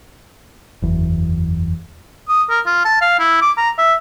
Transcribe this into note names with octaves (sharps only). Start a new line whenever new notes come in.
F#1 E2
D#6
A#4
F4
A5
F5
E4
D6
A#5
E5